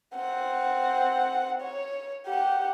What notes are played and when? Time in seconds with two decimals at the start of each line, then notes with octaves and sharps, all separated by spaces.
0.15 C4 F#5
1.61 C#5
2.27 G4 F#5